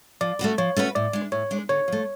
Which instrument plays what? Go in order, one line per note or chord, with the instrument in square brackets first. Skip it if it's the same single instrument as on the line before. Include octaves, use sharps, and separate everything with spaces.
[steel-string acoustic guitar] F3 [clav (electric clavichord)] D5
[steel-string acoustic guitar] A3 C#4 F#4 B4
[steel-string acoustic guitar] F3 [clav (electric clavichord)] C#5
[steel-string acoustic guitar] A3 C#4 F#4 B4
[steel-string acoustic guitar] A2 [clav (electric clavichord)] D5
[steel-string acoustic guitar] G#3 D4
[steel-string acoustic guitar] A2 [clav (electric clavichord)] C#5
[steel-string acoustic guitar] G#3 D4
[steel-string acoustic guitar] D3 [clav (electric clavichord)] C#5
[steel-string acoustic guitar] F3 A3